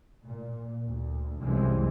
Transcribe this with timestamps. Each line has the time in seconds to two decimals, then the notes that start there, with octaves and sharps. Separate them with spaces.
0.24 A#2
0.86 D2
1.41 C2 F#2 E3 G#3 C4